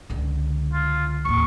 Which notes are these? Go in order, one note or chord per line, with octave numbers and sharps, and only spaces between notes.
C#2 D3
F4
A1 D#2 C#6